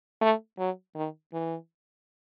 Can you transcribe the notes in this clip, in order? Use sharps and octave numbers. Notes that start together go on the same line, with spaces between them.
A3
F#3
D#3
E3